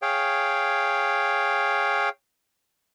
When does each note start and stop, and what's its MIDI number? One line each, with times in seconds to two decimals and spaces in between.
0.02 2.09 68
0.02 2.09 73
0.02 2.09 77
0.02 2.09 79